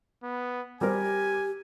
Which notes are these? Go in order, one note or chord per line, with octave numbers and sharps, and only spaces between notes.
B3
G3 C4 G4 A#4 G#5